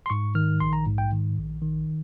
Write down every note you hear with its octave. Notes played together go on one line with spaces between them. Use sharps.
C6
G#2 C#6
D#3 F6
A#1 C6
A#5
G#2
G5
D#3
A#1
D#3